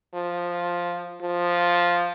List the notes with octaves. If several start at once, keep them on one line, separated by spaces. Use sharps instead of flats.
F3
F3